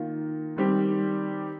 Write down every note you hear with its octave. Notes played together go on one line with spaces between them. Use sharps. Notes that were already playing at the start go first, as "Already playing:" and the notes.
Already playing: D#3 A#3 F4
D#3 G3 C4 G4